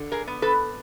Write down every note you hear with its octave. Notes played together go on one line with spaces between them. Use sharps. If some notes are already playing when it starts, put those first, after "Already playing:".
Already playing: D3
G#4 A#4
B3
A4 B4